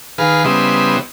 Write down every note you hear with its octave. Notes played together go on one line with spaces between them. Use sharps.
D#3 G#4 B4 F5
C#3 G3 B3 E4 C5 D#5